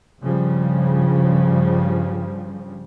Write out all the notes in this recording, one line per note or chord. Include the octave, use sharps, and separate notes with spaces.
G2 C#3 F3 G3